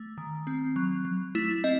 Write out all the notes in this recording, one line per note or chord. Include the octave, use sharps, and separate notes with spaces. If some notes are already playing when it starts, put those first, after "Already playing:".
Already playing: A3
D#3
C4
F#3
F#3
A3 E4
C4 D#5